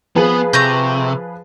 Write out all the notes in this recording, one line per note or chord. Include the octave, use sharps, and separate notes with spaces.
F3 B3 G#4 B4
C3 A3 A#5 G6